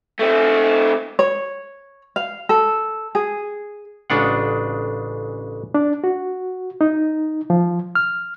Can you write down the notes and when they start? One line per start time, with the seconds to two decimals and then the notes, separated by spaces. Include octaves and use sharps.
0.19 A3 C4
1.19 C#5
2.16 F5
2.49 A4
3.15 G#4
4.10 A1 C#3 G#3 D4 F4 F#5
5.74 D4
6.04 F#4
6.81 D#4
7.50 F3
7.95 F6